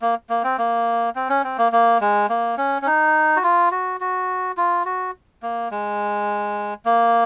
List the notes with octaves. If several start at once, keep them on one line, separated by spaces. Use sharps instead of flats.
A#3
A#3
C4
A#3
C4
C#4
C4
A#3
A#3
G#3
A#3
C#4
C#4
D#4
F#4
F4
F#4
F#4
F4
F#4
A#3
G#3
A#3